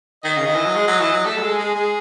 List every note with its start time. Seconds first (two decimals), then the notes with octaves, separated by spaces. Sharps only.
0.24 D#3 D#5
0.37 C#3
0.46 D#3
0.55 E3
0.66 F#3
0.75 G#3
0.88 F#3
1.00 E3
1.13 F#3
1.25 A3 A4
1.37 F#3
1.41 G#3
1.50 G#4
1.59 G#3
1.75 G#3 G#4